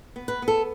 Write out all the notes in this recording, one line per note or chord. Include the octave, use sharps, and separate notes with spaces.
B3
B4
B3
A4